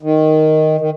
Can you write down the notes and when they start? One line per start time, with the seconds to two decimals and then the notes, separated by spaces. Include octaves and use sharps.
0.03 D#3
0.80 D#3